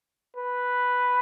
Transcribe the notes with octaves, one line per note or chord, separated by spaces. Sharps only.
B4